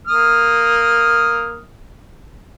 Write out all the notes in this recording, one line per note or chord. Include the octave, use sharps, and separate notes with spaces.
A#3 D#6 F6